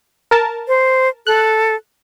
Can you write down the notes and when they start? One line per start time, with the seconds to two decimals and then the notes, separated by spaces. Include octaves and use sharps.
0.31 A#4 A5
0.68 C5
1.27 A4 F#6